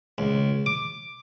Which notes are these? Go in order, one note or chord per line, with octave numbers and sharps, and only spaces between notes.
C#2
D6